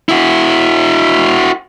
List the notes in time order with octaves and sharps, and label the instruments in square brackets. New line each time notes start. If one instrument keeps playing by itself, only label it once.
[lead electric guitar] E4 F#4